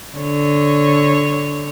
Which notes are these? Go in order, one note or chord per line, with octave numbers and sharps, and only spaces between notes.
D3 C#5